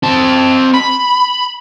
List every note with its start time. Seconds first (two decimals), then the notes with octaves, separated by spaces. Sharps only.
0.03 C4 A5
0.74 B5